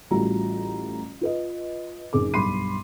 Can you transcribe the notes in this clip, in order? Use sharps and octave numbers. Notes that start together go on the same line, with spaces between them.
A1 A2 G3 F4 F#4 A#5
F4 B4 D#5
F#1 D#4 G#4 D6
B1 G2 B5 C6 C7 D#7